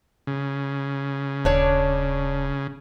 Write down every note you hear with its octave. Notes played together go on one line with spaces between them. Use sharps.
C#3
D#1 D4 C#5